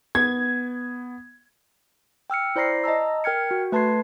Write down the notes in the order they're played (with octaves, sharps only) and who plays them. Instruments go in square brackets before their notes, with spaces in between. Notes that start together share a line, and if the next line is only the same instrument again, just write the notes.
[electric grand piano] B3 [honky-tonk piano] G#6
[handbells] G5 E6 F6 C#7
E4 C5 D5 A#5 A#6 C7
D#5 A5 A#5 E6
A#4 G5 F6 G#6 C#7
F#4
A3 B4 A5 C6 G#6 C7